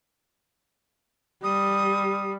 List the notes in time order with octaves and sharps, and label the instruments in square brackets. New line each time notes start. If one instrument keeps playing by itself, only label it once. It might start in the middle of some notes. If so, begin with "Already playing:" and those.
[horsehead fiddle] G3 [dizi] D#6